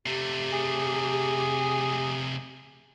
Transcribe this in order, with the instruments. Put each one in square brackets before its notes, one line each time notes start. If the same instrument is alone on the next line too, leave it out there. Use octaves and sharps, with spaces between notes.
[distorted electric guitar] C3 A3 [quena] G4
[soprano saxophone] G#4